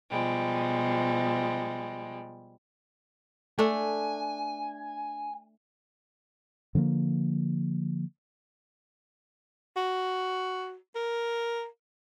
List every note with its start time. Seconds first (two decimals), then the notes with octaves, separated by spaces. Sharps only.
0.10 B2 F3 G3 G#3
3.59 A3 D4 G#5
6.75 D3 F3 A3 A#3
9.77 F#4
10.95 A#4